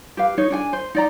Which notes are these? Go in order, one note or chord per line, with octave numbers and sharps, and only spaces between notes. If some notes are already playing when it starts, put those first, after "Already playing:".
G4 B4 F5
D#4 C#5
D4 G#4 G#5
C5
D#4 D5 A#5